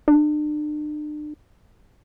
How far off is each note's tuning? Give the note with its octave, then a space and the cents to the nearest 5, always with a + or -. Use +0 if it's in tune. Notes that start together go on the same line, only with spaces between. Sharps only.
D4 +40